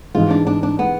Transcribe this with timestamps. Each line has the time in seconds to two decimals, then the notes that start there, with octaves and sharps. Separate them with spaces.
0.14 G#2 E3 G#3 F4
0.30 D4
0.47 D4
0.63 D4
0.79 B3